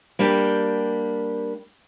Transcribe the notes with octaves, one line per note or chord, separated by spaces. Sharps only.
G3 A#3 D4 G4